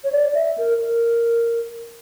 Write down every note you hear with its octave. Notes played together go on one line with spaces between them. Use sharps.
C#5
D5
E5
A#4
A#4